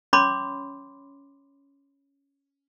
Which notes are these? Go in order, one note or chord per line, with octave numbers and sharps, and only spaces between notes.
C#4 C#5 B5 C6 D6